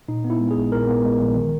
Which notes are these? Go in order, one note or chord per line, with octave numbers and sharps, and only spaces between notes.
A#2 D#4
B3
E4
G#3
G#4
A#1
A#2 A#4
B3
G#3
A#1
D#3